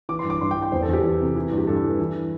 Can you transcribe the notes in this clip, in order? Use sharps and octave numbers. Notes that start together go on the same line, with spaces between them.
E3 D6
C6
G2
D6
G2 C6
G5
E3
G5
E2 C5
A4
E2 G4
E3 A4
C3
E3
G2
G4
G2 A4
E3
E3